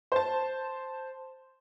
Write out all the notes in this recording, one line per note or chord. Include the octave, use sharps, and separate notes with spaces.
C5 A5